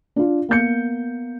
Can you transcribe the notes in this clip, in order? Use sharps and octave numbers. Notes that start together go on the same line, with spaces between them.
D4 F4
A#3 B3 G6 C#7